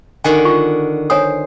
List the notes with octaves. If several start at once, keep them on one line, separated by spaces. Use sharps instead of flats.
D3 D#3 F#4 G#5
F4 C#6
C5 C#5 G#5 D#6